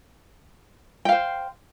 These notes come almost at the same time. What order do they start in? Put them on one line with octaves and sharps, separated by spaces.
G5 F5 C5